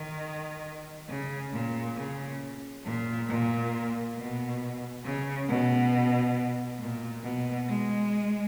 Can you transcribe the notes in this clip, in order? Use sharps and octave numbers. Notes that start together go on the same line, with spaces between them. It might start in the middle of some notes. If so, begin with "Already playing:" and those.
Already playing: D#3
C#3
A#2
C#3
A#2
A#2
B2
C#3
B2
A#2
B2
G#3